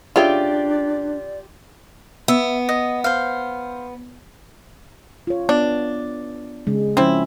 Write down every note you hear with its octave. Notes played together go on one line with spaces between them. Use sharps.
C#3 D4 F4 G4 C#5 D5 E5
B3 E5
D#5
C5 F5
F4 C#5
B3 D4
C#3 G#3
F3 C4 C#4 E4